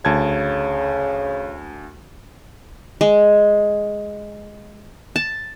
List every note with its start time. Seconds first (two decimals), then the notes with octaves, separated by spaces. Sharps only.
0.05 D2 C#3 A5 G#6
3.01 G#3
5.16 A5